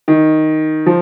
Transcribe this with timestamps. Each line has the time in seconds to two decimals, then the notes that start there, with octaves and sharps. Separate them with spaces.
0.08 D#3
0.86 F3